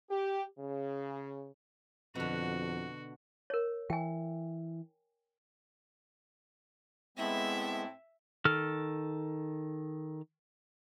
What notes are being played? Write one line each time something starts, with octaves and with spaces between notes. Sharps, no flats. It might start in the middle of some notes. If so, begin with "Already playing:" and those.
G4
C#3
F2 B2 D3 F#4
A#4 C#5
E3 G5 G#5
A2 G#3 B3 C4 E4 E5
D#3 A4 F6